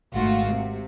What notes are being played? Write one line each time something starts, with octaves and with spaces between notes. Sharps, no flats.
G#1 A3 F4 F#4
C3